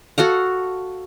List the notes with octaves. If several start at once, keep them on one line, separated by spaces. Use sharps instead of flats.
F#4 A4 F5 F#5